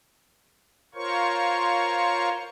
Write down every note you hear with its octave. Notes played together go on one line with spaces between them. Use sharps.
F4 A#4 C5 C#5 C#6